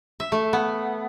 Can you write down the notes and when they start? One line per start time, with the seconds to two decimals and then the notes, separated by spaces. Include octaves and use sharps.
0.20 E5
0.32 A3
0.53 B3